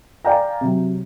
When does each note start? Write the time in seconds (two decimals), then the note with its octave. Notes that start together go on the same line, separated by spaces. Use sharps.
0.25 D5 F5 G5 G#5 A#5
0.61 C3 F#3